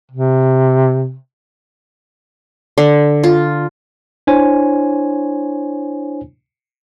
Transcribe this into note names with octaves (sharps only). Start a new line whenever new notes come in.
C3
D3
F4
D4 E4 C5 C#5 G#5